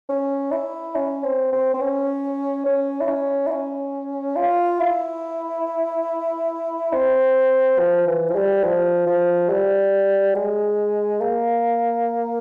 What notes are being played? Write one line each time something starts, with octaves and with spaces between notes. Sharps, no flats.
C#4
E4
C#4
C4
C4
C4
C#4
C#4
E4
C#4
E4
C#4
F4
E4
C4
F3
E3
F3
G3
F3
F3
G3
G#3
A#3